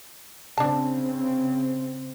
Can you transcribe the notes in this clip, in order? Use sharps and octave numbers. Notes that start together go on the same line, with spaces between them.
C#3 C4 D4 A5